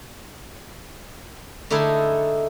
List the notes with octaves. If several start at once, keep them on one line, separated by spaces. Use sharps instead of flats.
D3 A3 D#4 E4 G#4